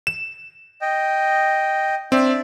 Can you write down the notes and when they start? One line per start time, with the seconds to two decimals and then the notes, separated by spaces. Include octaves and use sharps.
0.07 E7
0.81 D#5 G5
2.12 C4 D4 D5 E5